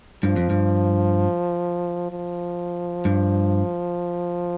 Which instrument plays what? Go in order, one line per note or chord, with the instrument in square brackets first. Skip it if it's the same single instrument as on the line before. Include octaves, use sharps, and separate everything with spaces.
[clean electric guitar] G2 [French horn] F3
[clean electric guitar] F2
G2
[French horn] F3
[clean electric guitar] G2